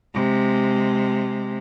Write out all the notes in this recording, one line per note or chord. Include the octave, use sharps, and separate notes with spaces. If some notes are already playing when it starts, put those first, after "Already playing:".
C3 G#3